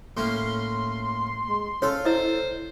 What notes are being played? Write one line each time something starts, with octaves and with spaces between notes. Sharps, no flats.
A2 A#3 C#4 C6
G#3
C#4 F4 A4 C#5
E4 C5 D#5